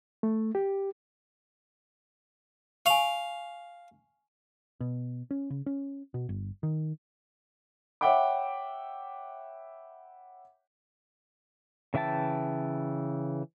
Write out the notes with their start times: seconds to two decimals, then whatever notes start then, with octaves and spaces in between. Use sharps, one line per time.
0.23 A3
0.55 G4
2.86 F5 G#5 C#6
4.81 B2
5.31 C#4
5.50 C#3
5.66 C#4
6.14 B2
6.29 G1
6.63 D#3
8.01 C#5 E5 F#5 G5 B5 D6
11.94 C#3 E3 E5 G5 A5